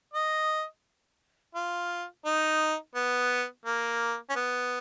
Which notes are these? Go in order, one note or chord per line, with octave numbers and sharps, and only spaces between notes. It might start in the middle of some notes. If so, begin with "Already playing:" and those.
D#5
F4
D#4
B3
A#3
C#4
B3